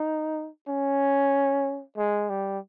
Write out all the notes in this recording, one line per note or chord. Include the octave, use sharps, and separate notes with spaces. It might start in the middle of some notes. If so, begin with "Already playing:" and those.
Already playing: D#4
C#4
G#3
G3